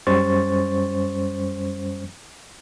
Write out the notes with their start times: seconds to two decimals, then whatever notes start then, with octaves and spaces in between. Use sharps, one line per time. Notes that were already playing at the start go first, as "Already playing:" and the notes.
0.07 F#2 G3 C#4 C5 C#6 A6